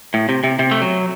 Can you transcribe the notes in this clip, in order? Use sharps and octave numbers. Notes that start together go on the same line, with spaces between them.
A2
C3
C3
C3
A3
F#3